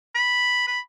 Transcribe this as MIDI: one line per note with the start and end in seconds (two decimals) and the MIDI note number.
0.15 0.66 83
0.67 0.80 83